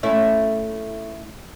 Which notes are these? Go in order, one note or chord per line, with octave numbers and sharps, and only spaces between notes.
A3 C#4 E4